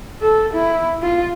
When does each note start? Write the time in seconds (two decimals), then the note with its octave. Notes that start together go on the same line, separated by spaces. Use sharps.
0.21 A4
0.54 E4
1.02 F4